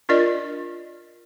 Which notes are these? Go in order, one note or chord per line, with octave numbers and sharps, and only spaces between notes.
D4 F4 A#4 D5 D#5